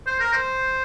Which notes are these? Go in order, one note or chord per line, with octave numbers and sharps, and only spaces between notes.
C5
A#4
C5